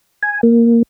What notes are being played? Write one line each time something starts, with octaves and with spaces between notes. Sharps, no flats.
G#5
A#3